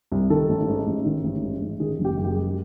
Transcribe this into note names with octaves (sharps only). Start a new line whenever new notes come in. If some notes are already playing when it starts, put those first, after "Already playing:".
C2
D#3 A4
A1
G#2
A1
D#3
A1
G#2
A1
D#3 G#4
F#1
G4
F#2
G4
G#4
G#3
G4